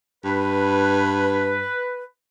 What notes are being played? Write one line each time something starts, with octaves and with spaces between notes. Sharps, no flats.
G2 B4